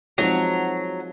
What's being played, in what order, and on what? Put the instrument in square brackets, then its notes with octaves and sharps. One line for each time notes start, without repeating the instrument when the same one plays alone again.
[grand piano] F3 G#3 C4 D#4 F#4 [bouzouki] F#3